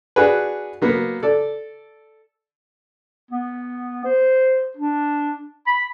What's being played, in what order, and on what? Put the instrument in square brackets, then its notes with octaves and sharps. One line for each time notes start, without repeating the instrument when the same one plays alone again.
[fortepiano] D4 F#4 G#4 B4
F#3 A#3 B3
A4 D5
[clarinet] B3
C5
D4
B5